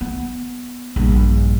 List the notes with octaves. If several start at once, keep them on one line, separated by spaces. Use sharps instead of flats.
B3
A#1 G2